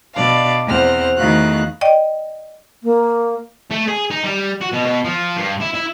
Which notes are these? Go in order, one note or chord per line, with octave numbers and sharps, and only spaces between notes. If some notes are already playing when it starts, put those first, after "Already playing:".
B2 D4 D5 F5
E2 C4 C5 F#5 F6
E2 D#3 A3 F#4 F5 F#6
D5 D#5 G5
A#3
A3
G#4
D#4
G3
F#4
B2
B2
F3
G2
E4
E4